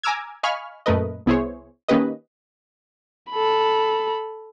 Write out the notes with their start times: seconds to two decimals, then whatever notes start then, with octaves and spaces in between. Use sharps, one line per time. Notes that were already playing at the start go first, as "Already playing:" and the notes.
0.03 G#5 A#5 D6 E6 F6 G#6
0.43 D#5 F5 G#5 B5 C#6 F6
0.86 F#2 A#2 A3 A#4 B4 D#5
1.26 C2 B3 E4 G#4 C5 C#5
1.88 D#3 A#3 C#4 G4 B4 D#5
3.31 A4 B5